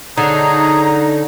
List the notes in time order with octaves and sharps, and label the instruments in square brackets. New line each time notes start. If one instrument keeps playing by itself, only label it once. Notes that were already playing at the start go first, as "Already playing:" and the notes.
[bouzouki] D3 [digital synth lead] D#4 [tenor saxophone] G#4 [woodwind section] C#5 A#5